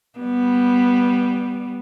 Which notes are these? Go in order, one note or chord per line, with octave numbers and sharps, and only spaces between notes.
G3 B3